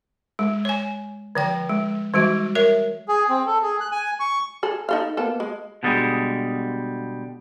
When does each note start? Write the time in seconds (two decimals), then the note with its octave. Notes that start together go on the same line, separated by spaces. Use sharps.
0.39 G#3
0.65 C#5 G#5
1.35 D3 F3 G5
1.69 G#3
2.14 E3 G3 G#3 F#4
2.55 A#4 C#5 E5
3.08 G#4
3.29 C4
3.46 A4
3.62 G#4
3.80 F#6
3.92 G#5
4.20 C#6
4.63 G#4 A4
4.89 D#4 A4 F5
5.17 A#3 B3 A4
5.40 G#3
5.83 B2 D3 G3 G#3